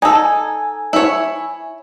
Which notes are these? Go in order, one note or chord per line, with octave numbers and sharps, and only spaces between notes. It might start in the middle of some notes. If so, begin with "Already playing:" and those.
D#4 A4 G#5
E4 C#5